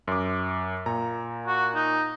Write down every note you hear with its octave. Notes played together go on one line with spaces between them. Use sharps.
F#2 D6
A#2 A#5
F#4
D#4